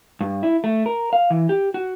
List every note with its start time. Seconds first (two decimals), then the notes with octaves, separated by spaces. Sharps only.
0.21 G2
0.43 E4
0.64 A3
0.86 A#4
1.13 F5
1.30 E3
1.49 G4
1.74 F#4